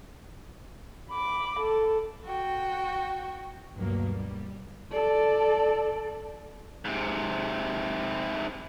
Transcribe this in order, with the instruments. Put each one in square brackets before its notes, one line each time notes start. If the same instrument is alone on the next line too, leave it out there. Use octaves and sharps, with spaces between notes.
[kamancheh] B5 D6
A4
[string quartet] F#4 G5
[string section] D2 G2 B2 F#3 A#3
G3
[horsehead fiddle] A4 D5
[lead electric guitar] G#2 C3